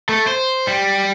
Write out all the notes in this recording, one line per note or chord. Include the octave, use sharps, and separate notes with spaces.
A3
C5
G3